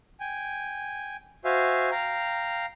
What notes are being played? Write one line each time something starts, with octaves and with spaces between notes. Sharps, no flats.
G5 G#5
F#4 C5 E5 F5 G#5
F5 G5 A#5